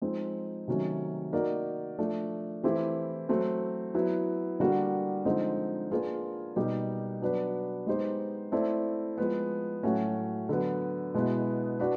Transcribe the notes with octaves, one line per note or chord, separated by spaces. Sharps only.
F3 G#3 C4 D#4
C3 D#3 F#3 A3 C#4
A#3 D#4 F#4 A#4 D5
F3 A3 D4
E3 A3 C4 E4 G4
F#3 A3 C4
F#3 B3 E4
D3 G3 A#3 D4 F#4
D3 F3 G#3 C4 D#4
A#3 D4 F4 G#4 B4
B2 G3 A#3 D#4 G4
F#3 B3 D4 F#4 B4
G#3 B3 D#4 G4 C5
A3 C4 E4 A4 D5
F3 G#3 B3
A2 F#3 A3 C#4 F#4
D3 F#3 B3
B2 G#3 B3 E4
D4 F#4 B4